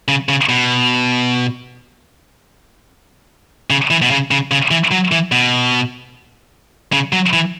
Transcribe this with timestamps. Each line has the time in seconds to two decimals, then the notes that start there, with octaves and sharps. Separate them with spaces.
0.08 C#3
0.29 C#3
0.49 B2
3.70 C#3
3.90 E3
4.02 B2
4.11 C#3
4.31 C#3
4.51 C#3
4.71 E3
4.91 F#3
5.12 E3
5.32 B2
6.92 C#3
7.13 F#3
7.33 E3